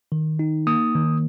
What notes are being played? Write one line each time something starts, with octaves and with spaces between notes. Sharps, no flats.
D#3
D#4
A#3 D#6
D#3